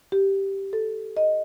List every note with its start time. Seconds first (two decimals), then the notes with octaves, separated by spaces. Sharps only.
0.12 G4
0.73 A4
1.17 D#5